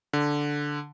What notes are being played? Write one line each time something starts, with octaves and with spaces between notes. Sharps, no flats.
D3